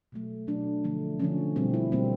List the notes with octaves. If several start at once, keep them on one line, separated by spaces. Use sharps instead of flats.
B2 F#3 A3
B2 F#3 A3 D4
D3 F3 A3
D3 F3 A3 C#4
B2 G3 A#3 C4
E4
B2 G3 A#3 C4